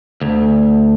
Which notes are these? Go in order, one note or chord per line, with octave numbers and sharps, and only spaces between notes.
D2